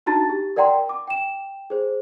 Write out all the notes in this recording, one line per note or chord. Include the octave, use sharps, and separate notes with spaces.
D4 D#4 F#4 A5 A#5 A6
G4
A#4 D5 F#5 G5 A#5 C6
D6
G5 E7
G#4 C5